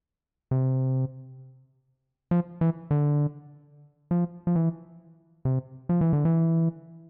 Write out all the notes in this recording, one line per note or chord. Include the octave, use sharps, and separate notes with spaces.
C3
F3
E3
D3
F3
F3
E3
C3
F3
E3
D3
E3